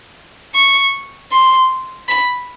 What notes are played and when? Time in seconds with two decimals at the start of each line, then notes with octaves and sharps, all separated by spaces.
0.55 C#6
1.32 C6
2.09 B5